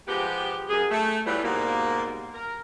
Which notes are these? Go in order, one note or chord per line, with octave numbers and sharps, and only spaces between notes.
F3 G#3 B3 G4
F#2 G#4
A3
A2 E3 F#3 G3 B3 F4
G#2 B2 G3 A#3
A#4